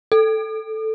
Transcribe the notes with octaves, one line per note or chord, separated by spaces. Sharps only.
A4